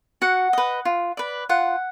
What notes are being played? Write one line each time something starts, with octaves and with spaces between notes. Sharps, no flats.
F#4 F#5
B4 D#5
F4
B4 D5
F4 F#5